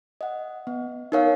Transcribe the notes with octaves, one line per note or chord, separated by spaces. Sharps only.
D#5 F#5
B3
D#4 A#4 C#5 F5